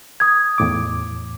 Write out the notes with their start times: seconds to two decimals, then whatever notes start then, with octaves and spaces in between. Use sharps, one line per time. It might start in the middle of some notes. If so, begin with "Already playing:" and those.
0.20 D#6 G#6
0.58 E2 A2 D6